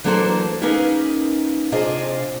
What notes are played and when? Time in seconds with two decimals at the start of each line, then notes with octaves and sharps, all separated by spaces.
0.04 E3 F#3 A#3 D4 A4 C5
0.62 A#3 C#4 D#4 G#4 A#4 B4
1.72 C3 D4 F4 G#4 D#5